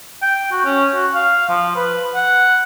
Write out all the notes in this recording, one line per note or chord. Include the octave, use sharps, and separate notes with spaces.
G5
F#4
C#4
F#4
F5
F3
B4
F#5